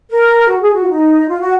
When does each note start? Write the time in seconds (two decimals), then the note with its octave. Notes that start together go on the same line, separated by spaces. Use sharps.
0.10 A#4
0.49 F#4
0.63 G#4
0.74 F#4
0.82 F4
0.89 D#4
1.28 F4
1.41 F#4